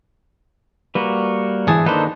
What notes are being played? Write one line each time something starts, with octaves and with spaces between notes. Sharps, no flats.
G3 A#3 F#4 B4
G1 G#2 E3 E4 G#4 A5
D#3 A#3 D4 D#4 A4 B4 C5